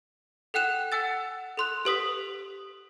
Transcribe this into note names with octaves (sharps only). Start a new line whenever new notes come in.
A4 F#5 G5 F#6 E7
F#5 G#5 E6 A6
A4 C6 F#6
G4 B4 D#6 B6